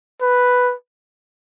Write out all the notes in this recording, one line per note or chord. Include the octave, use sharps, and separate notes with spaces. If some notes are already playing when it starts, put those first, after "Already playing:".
B4